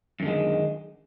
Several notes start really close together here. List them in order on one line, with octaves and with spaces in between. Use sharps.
F#2 D3 G#3 D#3